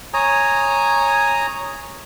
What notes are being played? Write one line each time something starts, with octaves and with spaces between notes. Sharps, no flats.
C#5 G#5 A#5 D#6